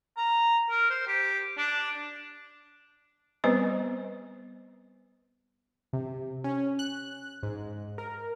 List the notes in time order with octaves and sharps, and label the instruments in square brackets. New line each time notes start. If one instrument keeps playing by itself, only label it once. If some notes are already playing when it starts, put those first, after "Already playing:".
[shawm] A#5
A#4
C5
G4
D4
[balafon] G3 B3 C4 B4 C5 D#5
[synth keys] C3
C#4
F#6
G#2
A#4